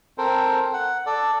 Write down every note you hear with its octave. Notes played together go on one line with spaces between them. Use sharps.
C4 A4 A#4 C5
F#5
A4 D5